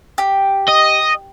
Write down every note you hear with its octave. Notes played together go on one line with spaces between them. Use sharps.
G4
D#5